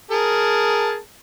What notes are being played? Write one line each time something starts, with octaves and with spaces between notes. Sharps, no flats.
G#4 A#4 A5